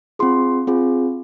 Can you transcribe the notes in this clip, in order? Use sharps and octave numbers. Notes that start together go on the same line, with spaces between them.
C4 F4 G#4 C6
C4 F4 G#4